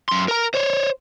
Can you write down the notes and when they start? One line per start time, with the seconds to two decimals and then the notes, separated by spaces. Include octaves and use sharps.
0.09 F#2 C6
0.28 A#4 A#5
0.54 C5 C#5